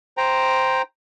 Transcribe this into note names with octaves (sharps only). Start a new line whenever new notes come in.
C5 G5 A#5